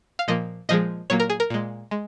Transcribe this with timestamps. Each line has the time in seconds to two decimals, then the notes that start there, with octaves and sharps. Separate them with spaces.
0.19 F5
0.28 A#2 F3 A#3 D#5
0.69 A#2 F3 G#3 D#5
1.10 A#2 F#3 A#3 C#5
1.20 A#4
1.30 G#4
1.40 A#4
1.50 A#2 G#3
1.91 G#3